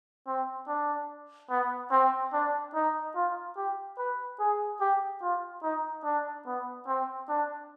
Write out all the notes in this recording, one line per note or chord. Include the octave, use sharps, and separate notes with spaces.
C4
D4
B3
C4
D4
D#4
F4
G4
B4
G#4
G4
F4
D#4
D4
B3
C4
D4